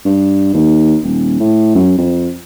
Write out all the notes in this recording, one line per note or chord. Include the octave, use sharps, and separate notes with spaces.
G2
D#2
D#1
A2
F#2
F2